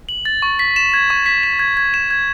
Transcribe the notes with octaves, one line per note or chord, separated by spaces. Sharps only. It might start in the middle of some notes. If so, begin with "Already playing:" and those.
F#7
A6
C#6
B6
E7
G#6
C#6
B6
E7
G#6
G#6
E7
G#6